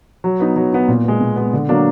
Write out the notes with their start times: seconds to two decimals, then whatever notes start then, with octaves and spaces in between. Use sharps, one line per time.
0.24 F#3
0.40 B3 D#4
0.56 F#3
0.73 B3 D#4
0.88 A#2
1.04 G#3 B3
1.21 A#2
1.36 G#3 B3
1.53 D3
1.69 F#3 A#3 D4